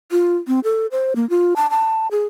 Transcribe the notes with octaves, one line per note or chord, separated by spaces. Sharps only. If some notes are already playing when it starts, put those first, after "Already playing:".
F4
C4
A4
C5
A#3
F4
A5
A5
G#4